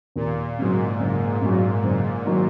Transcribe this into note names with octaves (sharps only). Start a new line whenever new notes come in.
D#2 A#2
G#2 C#3 F#3
F#1
F#2 F#3
F#1
D#3 F#3